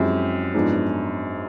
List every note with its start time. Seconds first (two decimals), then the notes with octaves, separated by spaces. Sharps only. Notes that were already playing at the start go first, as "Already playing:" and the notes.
Already playing: F#2 F3 G#3 C4 E4 G4
0.54 G#2 F3 G#3 B3 D4